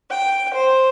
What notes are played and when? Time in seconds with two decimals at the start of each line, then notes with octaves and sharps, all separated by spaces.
0.11 G5
0.54 C5